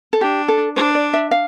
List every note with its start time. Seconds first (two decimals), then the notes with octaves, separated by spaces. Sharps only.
0.13 A4
0.21 D4 G4
0.48 A4
0.76 D4 C5
0.95 D5
1.14 E5
1.31 F5